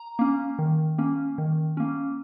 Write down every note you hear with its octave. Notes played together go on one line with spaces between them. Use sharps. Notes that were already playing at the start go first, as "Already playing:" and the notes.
Already playing: A#5
A#3 C#4
D#3
A#3 C#4
D#3
A#3 C#4